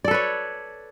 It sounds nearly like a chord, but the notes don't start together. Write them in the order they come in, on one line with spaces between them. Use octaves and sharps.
D5 A4 B4 C#5